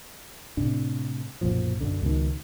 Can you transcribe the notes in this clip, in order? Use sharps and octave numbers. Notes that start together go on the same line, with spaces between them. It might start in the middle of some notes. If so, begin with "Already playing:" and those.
A2 C3 D4
B1 F#2 A#2 F3
B1 F#2 D3
C#2 B2 D#3